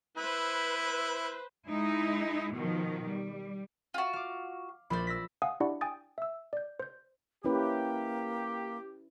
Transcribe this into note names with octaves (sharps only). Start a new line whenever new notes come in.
E4 B4 C5
G#3 D#4 E4
B2 D#3 F3
G3
F4 F#4
F5 D6
A#1 C5 D5 B5
E6 A#6 B6
F5 F#5 G#5 D#6
D4 E4 G4 D5 F#5 C#6
G5 G#5 D#6 A6
E5 E6
D5 G6
C5 G6
A#3 C#4 E4 G4 B4